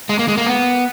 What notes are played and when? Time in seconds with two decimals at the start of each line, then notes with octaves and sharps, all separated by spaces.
0.09 G#3
0.19 A#3
0.28 G#3
0.37 A#3
0.47 B3